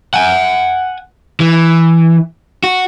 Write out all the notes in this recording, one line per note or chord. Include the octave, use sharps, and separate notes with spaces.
F#5 G#5
E3
F#4